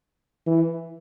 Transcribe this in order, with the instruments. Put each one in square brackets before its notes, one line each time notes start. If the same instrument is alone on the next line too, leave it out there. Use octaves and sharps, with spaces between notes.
[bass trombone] E3